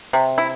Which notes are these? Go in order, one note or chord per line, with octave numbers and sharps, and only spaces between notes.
C3
E4